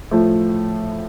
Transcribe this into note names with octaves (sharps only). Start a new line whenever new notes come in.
A2 F3 A3